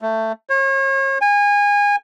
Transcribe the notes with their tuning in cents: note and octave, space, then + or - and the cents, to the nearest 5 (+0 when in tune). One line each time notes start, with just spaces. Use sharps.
A3 +15
C#5 -40
G#5 -25